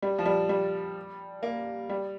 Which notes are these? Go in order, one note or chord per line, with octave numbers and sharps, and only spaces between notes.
G3
F3
G3
G3
A#3
G3